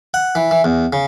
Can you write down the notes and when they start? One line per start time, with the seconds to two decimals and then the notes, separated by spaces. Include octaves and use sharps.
0.14 F#5
0.35 E3
0.51 E3
0.64 E2
0.93 C#3